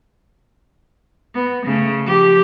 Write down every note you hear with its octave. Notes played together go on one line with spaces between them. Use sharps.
B3
C#3 A3
F3 G4